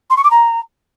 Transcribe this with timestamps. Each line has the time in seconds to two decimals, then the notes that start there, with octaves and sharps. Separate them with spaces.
0.10 C6
0.17 C#6
0.23 D6
0.30 A#5